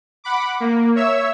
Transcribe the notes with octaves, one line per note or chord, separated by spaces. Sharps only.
F#5 B5 D6
A#3
C#5 E5 E6